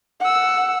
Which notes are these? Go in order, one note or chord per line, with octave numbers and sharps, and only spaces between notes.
F#5 E6